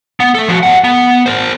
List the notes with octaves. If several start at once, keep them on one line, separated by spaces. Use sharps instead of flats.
B3
A3 A4
F3 F#4
G3 F#5
B3
A#4 C5